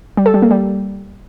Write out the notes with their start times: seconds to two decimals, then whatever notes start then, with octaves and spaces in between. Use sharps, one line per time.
0.17 G3
0.26 A4
0.34 G3
0.42 A#3
0.51 G3